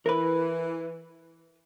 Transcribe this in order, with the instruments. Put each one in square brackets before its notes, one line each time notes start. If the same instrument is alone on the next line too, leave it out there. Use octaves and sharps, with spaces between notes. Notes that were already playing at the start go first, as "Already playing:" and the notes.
[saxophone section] E3 [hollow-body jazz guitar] A#4 B4